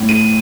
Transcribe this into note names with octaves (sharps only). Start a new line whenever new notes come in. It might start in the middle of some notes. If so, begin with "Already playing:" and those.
Already playing: A2
D#7